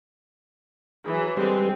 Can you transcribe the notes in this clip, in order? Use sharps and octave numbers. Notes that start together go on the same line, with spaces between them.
E3 F#3 G#4
D3 G3 G#3 C4 G4 B4